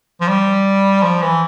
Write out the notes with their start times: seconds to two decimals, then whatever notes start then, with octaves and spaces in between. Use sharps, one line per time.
0.21 F3
0.29 G3
1.03 F3
1.22 E3